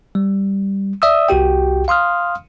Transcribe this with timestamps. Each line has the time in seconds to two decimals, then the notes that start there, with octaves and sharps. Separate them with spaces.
0.15 G3
1.02 D5 E5 D#6 E6
1.28 C2 F#4 G4 G5
1.88 F5 C6 D#6 F6